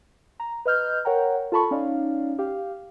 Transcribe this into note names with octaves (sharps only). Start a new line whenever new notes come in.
A#5
B4 D#5 F6 G6
A#4 C#5 F#5 G5 A#5
F4 A4 A5 B5 C#6
C#4 D#4 D5 F5
G4 F5